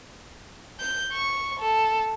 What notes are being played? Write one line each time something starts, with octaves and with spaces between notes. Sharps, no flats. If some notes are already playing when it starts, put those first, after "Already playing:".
G6
C#6
A4